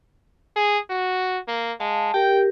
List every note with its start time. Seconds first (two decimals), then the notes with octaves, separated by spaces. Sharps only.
0.56 G#4
0.90 F#4
1.48 A#3
1.80 G#3 F5 A5
2.14 G4 A#4 G5